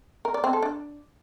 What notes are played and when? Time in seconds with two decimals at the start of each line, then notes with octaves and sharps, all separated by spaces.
0.25 A#4
0.34 D5
0.44 C4
0.53 A4
0.62 D4